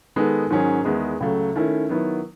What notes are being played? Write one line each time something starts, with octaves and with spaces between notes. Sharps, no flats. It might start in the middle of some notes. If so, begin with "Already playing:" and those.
D#3 G#3 B3 D#4 A4
G#2 D#3 F#3 C#4 G#4
E2 D#3 G#3 B3
C#2 C#3 F#3 A3
D#3 A3 C#4 E4
D#3 F#3 B3 E4